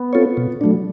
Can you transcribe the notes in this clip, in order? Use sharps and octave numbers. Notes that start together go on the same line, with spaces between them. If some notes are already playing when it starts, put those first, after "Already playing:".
Already playing: B3
C4 F4 A4 C#5
B2
F#3 A3 D4